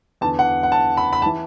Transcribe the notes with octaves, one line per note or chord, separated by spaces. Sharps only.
E2 D3 A5
F#5
F#5
A5
B5
B5
A5
E3